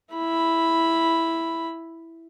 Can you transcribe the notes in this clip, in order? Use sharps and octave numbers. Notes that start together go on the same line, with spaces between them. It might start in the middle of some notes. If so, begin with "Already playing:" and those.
E4 B5